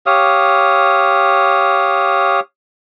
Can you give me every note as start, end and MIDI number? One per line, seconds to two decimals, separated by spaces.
0.06 2.40 67
0.06 2.40 73
0.06 2.40 77
0.06 2.40 87